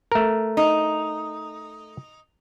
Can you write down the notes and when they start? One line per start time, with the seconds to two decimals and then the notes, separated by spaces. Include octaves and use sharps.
0.12 A3 A#4
0.57 D#4